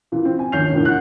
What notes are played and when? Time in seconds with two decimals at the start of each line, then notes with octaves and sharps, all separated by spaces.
0.12 A#2 E3
0.25 C4
0.39 G#5
0.52 A#1 D#2 C#4 G6 C7 F7
0.72 E1 A#1 A2
0.85 F#5 F#6